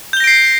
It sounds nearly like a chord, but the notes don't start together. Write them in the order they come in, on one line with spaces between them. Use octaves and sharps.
G6 G7 A#6 D7 C7